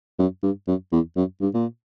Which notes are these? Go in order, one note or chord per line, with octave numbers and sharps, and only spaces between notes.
F#2
G2
F#2
E2
F#2
G2
A#2